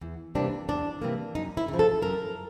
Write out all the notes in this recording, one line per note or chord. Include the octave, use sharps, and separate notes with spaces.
E2
C3 E3 G3 A#3 D4
E2 D4
C3 E3 G3 A#3
F#2 D#4
E4
C#3
F3
A4
F#2 A#4